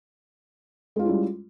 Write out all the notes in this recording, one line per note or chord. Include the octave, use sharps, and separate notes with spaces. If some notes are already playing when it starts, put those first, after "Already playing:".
G3 G#3 C#4 E4 F4